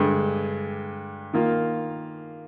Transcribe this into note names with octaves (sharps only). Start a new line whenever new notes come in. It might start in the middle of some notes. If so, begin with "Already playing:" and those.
Already playing: G2 D3 G#3
D#3 A#3 F4